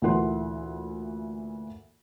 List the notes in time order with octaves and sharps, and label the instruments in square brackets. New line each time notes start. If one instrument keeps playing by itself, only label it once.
[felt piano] D2 A#2 E3 A#4 F#5 C6